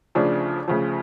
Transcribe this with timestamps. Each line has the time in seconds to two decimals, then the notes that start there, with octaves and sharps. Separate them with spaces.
0.15 D2 C#3 F3 D4
0.68 D2 C#3 F3